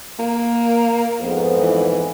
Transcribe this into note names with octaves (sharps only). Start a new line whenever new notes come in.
A#3
F2 G#2 B3
E3